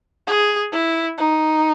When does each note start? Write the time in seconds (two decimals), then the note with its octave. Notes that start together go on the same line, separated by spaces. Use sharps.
0.27 G#4
0.72 E4
1.18 D#4